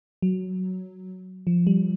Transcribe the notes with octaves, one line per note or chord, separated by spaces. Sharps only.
F#3
F3
G3